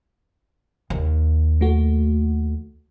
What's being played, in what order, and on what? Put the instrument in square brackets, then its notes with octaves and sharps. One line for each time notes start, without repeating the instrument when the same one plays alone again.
[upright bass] D#2
[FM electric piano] A3 F#4